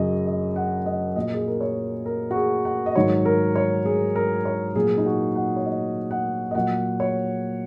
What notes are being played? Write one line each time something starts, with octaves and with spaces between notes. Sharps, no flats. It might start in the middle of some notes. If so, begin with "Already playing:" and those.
Already playing: F#2 C#3 F#3 D#5
D#5
F#5
D#5
A#2 F#3 D#5
G#4
A#4
C#5
A#4
F#4
G#4
F#5
D#5
G#2 D#3 F#3 C#5
A#4
C#5
G#4
A#4
C#5
A#2 F#3 G#4
D#4
F#4
F#5
C#5
D#5
F#5
D#5
A#2 F#3 F#5
C#5